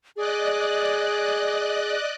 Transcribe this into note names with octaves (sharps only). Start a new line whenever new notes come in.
G#4 D5 D#5 F#6